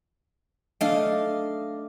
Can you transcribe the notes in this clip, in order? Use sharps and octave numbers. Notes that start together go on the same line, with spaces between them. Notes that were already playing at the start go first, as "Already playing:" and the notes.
A3 D4 D#5 F5